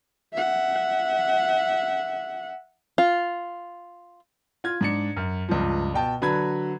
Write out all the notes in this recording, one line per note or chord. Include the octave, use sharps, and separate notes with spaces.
E5 F#5
F4
F4 G#6
G#2 D4 C#7
F#2
C#2 G2 F3
B2 G5 A5
D3 F#3 B4 B5 G#6